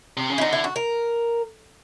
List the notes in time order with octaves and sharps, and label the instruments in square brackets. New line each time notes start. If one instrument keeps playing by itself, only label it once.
[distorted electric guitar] C3
C#3
[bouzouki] E4
[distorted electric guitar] D3 [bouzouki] D#4
[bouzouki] E4
F#4
A#4